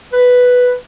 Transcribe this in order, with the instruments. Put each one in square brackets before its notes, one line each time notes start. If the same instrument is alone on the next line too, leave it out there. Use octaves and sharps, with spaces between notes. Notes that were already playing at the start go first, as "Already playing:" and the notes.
[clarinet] B4